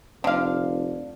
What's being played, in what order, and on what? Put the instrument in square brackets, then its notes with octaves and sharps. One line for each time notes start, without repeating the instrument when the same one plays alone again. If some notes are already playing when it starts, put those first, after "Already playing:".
[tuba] F1 [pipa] D3 F5